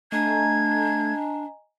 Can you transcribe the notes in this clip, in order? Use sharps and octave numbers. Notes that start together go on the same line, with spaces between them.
A3 D4 D#5 G#5 A#5 G#6